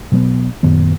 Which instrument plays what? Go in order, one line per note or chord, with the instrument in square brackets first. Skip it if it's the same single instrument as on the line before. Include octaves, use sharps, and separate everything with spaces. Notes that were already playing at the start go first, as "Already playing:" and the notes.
[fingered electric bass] B2 F#3 G3 B3
F#2 A#2 D#3 B3